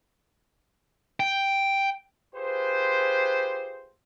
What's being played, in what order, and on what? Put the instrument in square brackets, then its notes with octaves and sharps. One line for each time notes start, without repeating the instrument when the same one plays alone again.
[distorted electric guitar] G5
[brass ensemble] F4 G4 G#4 B4 C5